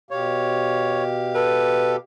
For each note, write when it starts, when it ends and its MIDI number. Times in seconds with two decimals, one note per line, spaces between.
0.11 1.96 47
0.11 1.96 67
0.11 1.04 73
0.11 1.96 77
1.35 1.96 69
1.35 1.94 71